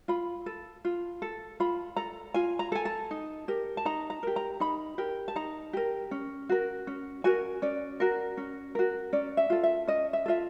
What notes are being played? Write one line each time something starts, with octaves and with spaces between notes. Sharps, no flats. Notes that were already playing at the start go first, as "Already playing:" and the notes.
F4 B5
A4
F4
A4
F4 B5
A4 A#5
F4 G#5
A#5
A4 G#5
A5
D#4
G4 A#4
A5
D#4 A#5
A#5
G4 A#4
A#5
D#4 B5
G4 A#4
A5
D#4 A#5
G4 A#4
C#4
F#4 A#4
C#4
F#4 A#4 G#5
C#4 D5
F#4 A#4
C#4
F#4 A#4
C#4 D5
E5
F4 A4
E5
C#4 D#5
E5
F4 A4 E5